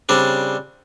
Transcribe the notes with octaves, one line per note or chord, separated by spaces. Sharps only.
C#3 G3 C4 D4